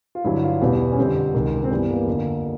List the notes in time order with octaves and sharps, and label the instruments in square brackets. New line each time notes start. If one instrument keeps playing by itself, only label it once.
[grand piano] F4
G2 D3 F#3 E4
F4
E2 B2 G3 E4
C#4
F2 D3 G3 C4
C#2 C3 D#3
C4
G2 E3 G3 B3
A#3
F2 D3 F3